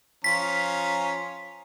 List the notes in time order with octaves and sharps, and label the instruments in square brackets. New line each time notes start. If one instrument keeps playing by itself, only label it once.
[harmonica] F3 C#4 A#5 [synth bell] B6